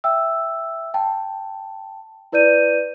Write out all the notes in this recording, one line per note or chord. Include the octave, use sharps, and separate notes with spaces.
E5 G5 E6
G5 A5
E4 B4 D5 G6 D#7